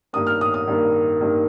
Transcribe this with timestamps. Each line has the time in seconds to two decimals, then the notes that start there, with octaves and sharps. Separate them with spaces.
0.13 G2 D#3 A#3 D#6
0.27 F6
0.41 D#6
0.54 D#6
0.68 G2 D#3 A#3
1.21 G2 D#3 A#3